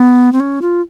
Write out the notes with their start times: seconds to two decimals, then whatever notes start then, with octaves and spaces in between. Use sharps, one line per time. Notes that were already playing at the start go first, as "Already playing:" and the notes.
Already playing: B3
0.32 C4
0.40 C#4
0.62 F4